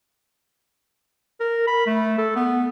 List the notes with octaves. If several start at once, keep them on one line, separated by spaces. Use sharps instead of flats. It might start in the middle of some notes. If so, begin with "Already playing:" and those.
A#4
B5
A3
A4
B3